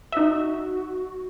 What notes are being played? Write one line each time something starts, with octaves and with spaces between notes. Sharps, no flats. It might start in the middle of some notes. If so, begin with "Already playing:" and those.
D#4 F#4 E5